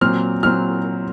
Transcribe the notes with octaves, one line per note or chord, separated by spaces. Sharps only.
A#2 F#3 C4 F6
A#2 F#3 C4 F6